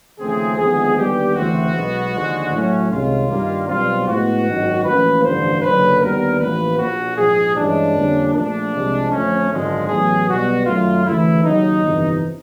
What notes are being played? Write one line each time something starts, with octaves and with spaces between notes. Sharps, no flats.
D#2 C#3 F3 A3 C4 G#4
D#2 D3 F3 G#3 B3 G#4
D#2 D3 G3 B3 G4
D2 C#3 E3 A3 C4 F#4
B1 B2 G#3 B3
D#2 D3 F3 G#3
A2 F#3 A3 C#4
C2 C3 D#3 G#3 C#4 F4
G2 D#3 G3 A#3
B1 B2 G3 C4 F4
A2 F3 G#3 B3 F#4
G#1 F#2 D#3
A1 A2 F3 A#3 C#4 B4
A1 G2 D3 F3 C5
F#1 F#2 D3 F#3 A#3 B4
D#2 D3 G3 B3 A#4
A1 A2 F3 A#3 B4
A#1 A#2 F3 F#4
A#1 G#2 F3 G#4
G2 E3 G#3 C#4 D4
F2 D3 G3 A#3 C#4
A#1 A#2 F3 A3 D4
C2 C3 F3 G#3
F2 D3 F3 A3 C#4
G#1 F#2 D3 F3 G#3
A1 A2 F#3 B3 G#4
B1 B2 G3 B3 F#4
F#2 D#3 F#3 A3 F4
D2 C#3 E3 A3 E4
D#2 C#3 F#3 D#4
G1 F2 C3 E3